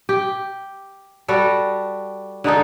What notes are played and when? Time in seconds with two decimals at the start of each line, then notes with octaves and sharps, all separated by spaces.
0.09 G4
1.28 G3 F#4 A4
2.44 D3 G#3 D#4 A4